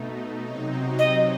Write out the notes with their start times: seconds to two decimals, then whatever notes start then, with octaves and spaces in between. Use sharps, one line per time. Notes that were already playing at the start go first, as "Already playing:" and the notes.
Already playing: B2 A3 D#4
0.43 C3 F#3 C4 D#4
0.99 D#5